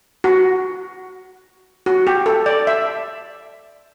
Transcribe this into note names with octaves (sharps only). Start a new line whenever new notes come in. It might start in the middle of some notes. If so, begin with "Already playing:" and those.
F#4
F#4
G4
A4
D5
E5